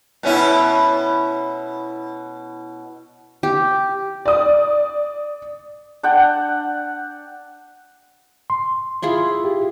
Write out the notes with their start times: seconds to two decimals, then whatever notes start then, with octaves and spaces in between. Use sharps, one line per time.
0.23 B2 C#4 E4
3.43 G4
4.26 D5 D#6
6.03 D4 F#5 G5
8.50 C6
9.02 E4 F4 G#4
9.44 G4